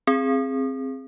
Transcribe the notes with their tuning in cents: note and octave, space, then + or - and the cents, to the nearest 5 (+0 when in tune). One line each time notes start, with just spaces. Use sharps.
C4 +10 G#4 +0